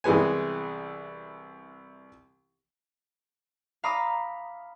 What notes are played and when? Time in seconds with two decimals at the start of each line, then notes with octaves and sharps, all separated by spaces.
0.04 C2 E3 G#3 B3 G#5
3.84 F5 A#5 B5 D6 D#6